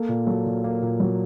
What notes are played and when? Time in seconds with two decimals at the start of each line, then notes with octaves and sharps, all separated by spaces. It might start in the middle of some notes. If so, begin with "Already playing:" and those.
Already playing: A#3 A4
0.09 A#2
0.27 F#3 A4
0.46 A#2
0.64 A#3
0.82 A#2
1.00 F#3